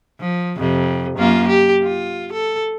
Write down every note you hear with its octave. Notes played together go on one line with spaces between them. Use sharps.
F3
F2 C3
F#2 A#3 F4
G4
F4
A4